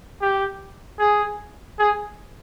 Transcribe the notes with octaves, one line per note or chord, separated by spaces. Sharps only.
G4
G#4
G#4